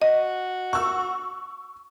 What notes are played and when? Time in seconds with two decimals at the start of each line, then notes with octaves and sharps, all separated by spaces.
0.02 F#4 D#5
0.73 C#6 E6